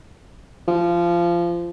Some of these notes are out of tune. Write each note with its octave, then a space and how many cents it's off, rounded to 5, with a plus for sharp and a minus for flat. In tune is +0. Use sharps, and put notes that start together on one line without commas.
F3 -20